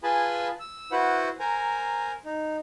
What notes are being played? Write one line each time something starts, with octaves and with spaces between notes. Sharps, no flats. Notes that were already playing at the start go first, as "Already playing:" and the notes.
F4 G#4 B4 G#5 A5 B5
E6
E4 F#4 B4 C5 F#5
A#4 C5 G#5 A#5
D#4